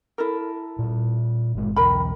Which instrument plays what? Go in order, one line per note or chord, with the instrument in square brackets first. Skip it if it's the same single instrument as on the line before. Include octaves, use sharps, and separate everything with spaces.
[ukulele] E4 A4 A#4
[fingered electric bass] A#2 G3
G1 G#3
[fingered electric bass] B1 E2 [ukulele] A#4 G5 B5